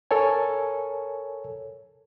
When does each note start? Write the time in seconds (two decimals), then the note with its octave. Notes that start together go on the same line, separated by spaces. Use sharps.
0.11 A4 A#4 C#5 G#5